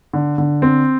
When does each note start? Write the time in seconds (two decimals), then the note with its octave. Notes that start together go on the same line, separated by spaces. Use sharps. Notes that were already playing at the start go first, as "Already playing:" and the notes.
0.13 D3
0.38 D3
0.62 C4